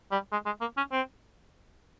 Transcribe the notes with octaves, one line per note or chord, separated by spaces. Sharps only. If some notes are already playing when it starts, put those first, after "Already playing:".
G3
G#3
G#3
A#3
C#4
C4